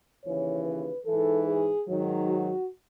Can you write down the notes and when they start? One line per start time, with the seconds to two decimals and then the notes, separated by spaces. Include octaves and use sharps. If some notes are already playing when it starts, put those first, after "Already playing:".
0.24 D#2 C#3 E3 C#5
0.65 B4
1.05 G#2 E3 A4
1.46 G#4
1.87 G#2 D#3 F#3
2.28 F#4